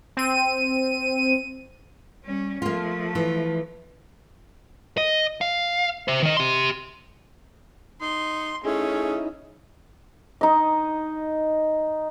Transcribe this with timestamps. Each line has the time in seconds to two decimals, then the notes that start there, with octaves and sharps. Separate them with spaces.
0.17 C4 D#7
2.24 G3 C#4
2.62 F3 A3 A#3 F4
3.15 E3
4.97 D#5
5.41 F5
6.08 C5 E5
6.23 D#3 D#5
6.37 G4 C6
8.01 D#4 C6
8.65 A3 C#4 D#4 E4 G#4
10.41 D#4 D#5